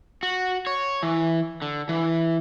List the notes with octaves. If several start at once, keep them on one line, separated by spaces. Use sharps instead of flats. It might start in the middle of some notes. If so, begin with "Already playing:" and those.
F#4
C#5
E3
D3
E3